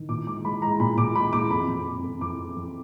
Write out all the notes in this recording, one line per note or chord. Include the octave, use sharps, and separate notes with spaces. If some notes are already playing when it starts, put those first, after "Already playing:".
Already playing: D#3
A#2 D6
G#3 D6
G#3 B5
G#3 A#5
A#2 B5
A#2 D6
G#3 B5
A#2 D6
F2 B5
F2
F2
F2
F2 D6
F2
F2